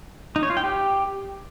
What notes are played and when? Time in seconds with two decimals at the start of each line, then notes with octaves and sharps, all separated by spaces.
0.36 D#4
0.43 C#5
0.50 F4
0.57 G5
0.64 G4